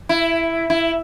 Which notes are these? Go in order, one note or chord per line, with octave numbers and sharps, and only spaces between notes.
E4
E4